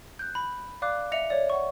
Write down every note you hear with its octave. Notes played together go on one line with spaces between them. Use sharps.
F#6 G6
B5
D5 F5 D6 F#6
D#5 E5 C#7 F7
C#5 D5
F#5 C#6